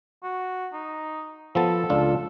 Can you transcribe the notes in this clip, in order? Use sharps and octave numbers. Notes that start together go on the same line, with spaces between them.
F#4
D#4
F3 B3 A4 A5
C#2 D4 F4